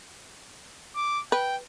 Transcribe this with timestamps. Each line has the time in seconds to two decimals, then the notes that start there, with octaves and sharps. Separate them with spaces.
0.96 D6
1.32 B4 G5